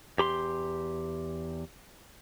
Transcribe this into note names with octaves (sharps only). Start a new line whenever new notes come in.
E2 G4 B5 C6